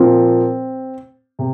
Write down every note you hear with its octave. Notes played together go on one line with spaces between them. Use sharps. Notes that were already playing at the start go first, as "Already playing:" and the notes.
Already playing: A#2 F3 A#3 C4 F4 A#4
C3